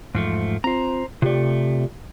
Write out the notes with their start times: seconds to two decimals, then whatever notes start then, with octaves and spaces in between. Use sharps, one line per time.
0.15 E2 G#2 F3 A3
0.64 C4 F4 C5 A#5
1.22 C3 A3 F4 G4 D5